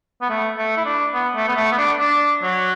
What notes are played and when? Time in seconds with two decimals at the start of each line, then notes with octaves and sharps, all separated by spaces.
0.21 B3
0.30 A3
0.57 A3
0.77 E4
0.85 D4
1.14 B3
1.36 A3
1.48 B3
1.56 A3
1.72 B3
1.78 D4
1.99 D4
2.42 F#3